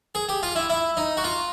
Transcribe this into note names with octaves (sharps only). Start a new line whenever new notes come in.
G#4
G4
F4
E4
E4
D#4
F#4
F4